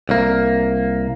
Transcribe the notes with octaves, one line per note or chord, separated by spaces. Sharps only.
C2 A#3